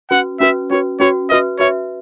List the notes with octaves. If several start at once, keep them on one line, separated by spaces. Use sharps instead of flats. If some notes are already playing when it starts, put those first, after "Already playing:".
C#4 F#4 B4 F#5
C#4 F#4 B4 E5
C#4 F#4 B4 C#5
C#4 F#4 B4 C#5
F#4 B4 D#5 E5
F#4 B4 C#5 E5